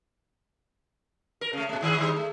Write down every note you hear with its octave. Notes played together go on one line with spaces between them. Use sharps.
A#4
C#3 A3
A#2 A3
G#2 D#3 G#4
G#2 D#3 G3
A3